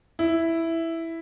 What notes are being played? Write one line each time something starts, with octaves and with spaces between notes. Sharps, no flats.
E4